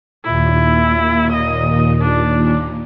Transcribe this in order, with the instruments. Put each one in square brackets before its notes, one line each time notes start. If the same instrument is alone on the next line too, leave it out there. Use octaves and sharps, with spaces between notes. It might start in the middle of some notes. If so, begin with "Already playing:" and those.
[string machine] D#2 A#2 [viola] E4
[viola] D#5
D4